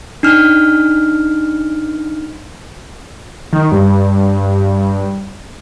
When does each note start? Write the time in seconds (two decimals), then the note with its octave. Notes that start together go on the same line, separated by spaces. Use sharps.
0.23 D4 D#4 F6
3.53 D#3
3.72 G2